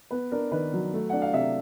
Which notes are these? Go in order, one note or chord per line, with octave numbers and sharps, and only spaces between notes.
B3 B4
D4 A#4
D#3 B4
F#3
A3
D4 F#5
F5
C3 E5